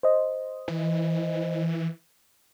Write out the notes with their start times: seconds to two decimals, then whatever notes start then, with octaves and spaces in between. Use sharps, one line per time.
0.03 C5 D#5
0.68 E3